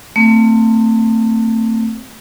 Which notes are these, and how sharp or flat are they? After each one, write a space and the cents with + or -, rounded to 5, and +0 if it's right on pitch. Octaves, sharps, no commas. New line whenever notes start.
A3 +30 C4 +0